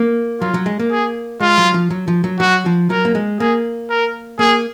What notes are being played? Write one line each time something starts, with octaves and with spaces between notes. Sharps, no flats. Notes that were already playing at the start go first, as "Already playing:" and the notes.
Already playing: A#3
F#3 F4
F#3
G#3
A#3
G#4
G#3 F4
F#3
F3
F#3
F3
F#3
F#3 F#4
F3
F#3 A#4
A#3
G#3
A#3 G#4
A#4
A#3 G#4